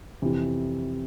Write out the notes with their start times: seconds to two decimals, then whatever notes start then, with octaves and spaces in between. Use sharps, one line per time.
0.22 F2 C3 E3